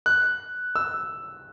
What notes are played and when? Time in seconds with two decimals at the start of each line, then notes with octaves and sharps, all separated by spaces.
0.06 F#6
0.76 E6